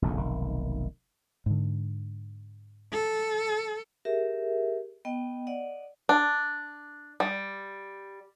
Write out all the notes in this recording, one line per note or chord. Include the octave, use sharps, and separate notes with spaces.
F1 A#1 D#2 D3
F1 B1 D#3
G#2 D3
A4
G4 G#4 A#4 E5
B3 D#5 G5
D5 D#5 F#5
D4
G3